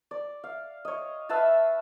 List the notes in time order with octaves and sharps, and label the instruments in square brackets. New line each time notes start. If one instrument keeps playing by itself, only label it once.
[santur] D5
F5
C#5 D#5
B4 E5 F5 A5